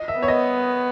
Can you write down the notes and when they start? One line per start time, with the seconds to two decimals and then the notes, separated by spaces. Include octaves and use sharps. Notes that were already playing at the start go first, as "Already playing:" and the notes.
Already playing: D#5
0.08 E5
0.18 B3 C#5
0.28 D#5